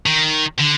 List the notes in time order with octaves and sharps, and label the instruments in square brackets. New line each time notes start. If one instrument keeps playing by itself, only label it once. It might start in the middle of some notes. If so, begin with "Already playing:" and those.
[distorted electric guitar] D#3
D3